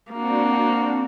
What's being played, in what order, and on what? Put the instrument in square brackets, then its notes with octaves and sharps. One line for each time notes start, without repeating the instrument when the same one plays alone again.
[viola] A#3 [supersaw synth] C4 D4 F#4